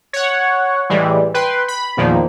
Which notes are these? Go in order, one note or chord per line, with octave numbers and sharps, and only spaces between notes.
C#5 F#5
A2 E3 G3 G#3
B4 G5 C6
B5
E2 A#2 D#3 F3 A#3